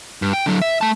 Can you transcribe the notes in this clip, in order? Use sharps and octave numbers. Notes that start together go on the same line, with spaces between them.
G2
G5
D3 F#3
E5
A3 A5